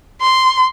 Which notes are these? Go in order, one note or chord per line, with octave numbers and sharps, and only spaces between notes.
C6